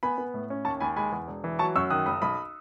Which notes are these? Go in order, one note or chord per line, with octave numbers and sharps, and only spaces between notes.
B3 G#5 B5
B3
A2
C#4
D#2 A5 C#6
D#2 G#5 B5
G#3 G#5 B5
E2
E1
E3
F#3 A5 C#6
F#2 C#6 E6
D#3 D#6 F#6
F#1 B5 D#6
B1 B5 D#6